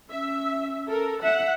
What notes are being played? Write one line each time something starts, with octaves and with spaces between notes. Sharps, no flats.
C#4 E5
A4 A#4
E5 F#5